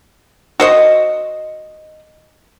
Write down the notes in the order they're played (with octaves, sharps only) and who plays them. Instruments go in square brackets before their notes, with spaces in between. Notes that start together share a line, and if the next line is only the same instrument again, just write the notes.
[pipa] F#4 C5 D#5